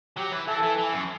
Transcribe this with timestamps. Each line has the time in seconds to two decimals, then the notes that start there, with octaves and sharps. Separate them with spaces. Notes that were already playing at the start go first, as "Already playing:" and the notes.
0.17 F#3 G4
0.33 E3
0.48 E3 A4
0.63 E3
0.78 E3
0.93 F#2